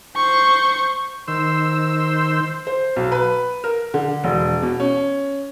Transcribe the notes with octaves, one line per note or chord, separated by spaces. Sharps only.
C5 C#6
D#3 C5 E6
C5
B1
B4
A#4
D3
E1
B2
C#4